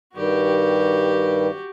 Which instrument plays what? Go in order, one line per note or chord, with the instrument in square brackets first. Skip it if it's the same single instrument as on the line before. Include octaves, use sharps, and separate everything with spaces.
[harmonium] G2 D#3 G3 [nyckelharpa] F#4 G4